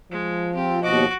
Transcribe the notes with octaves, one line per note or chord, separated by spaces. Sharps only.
F3 G#3
C4 F4 G4
D#2 B2 F#4 D#5 D6